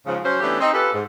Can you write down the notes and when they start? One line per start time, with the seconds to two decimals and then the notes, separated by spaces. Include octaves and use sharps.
0.06 G#2 C#3 F3
0.23 F3 F#3 C#4 C5
0.41 E3 A3 B3 C#4 D4 G4
0.60 C4 D#4
0.72 C#4 F4 G4 A4 B4
0.93 G#2